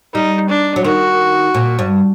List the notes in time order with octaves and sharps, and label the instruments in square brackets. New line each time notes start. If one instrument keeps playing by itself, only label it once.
[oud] G3 [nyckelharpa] D#4
[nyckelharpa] D4
[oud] F#3
[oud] D#3 [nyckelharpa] F#4
[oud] A#2
G2